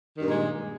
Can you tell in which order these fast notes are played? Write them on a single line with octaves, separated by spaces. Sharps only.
D#3 G2 A#2 G#3